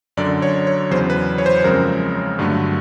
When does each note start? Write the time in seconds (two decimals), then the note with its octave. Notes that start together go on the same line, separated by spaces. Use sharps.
0.17 F#2 D3 F#3 D5
0.42 C#5
0.67 C#5
0.91 E2 C#3 F#3 C5
1.10 B4
1.38 C#5
1.46 C5
1.64 F#2 C#3 F3 G#3 C4 A#4
2.39 G2 D3 F#3 A3